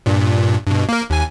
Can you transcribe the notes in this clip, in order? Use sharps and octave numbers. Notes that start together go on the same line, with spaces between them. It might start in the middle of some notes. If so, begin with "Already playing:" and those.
G2 A#2
G2 B2
A#3 A#4
D#2 G#5